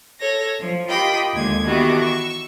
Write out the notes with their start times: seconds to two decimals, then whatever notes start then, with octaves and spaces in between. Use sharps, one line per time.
0.19 A4 C#5 A#6
0.60 F3
0.89 F4 G4 A#4 D#5 G5 B5
1.34 D#2 D3 G#3 G#6
1.64 D#3 E3 B3 F#4 G4 A4
1.98 C#6 E6